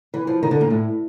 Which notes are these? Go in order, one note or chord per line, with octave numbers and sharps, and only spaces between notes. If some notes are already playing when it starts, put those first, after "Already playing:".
E3
F3
D#3
D3
A#2
A2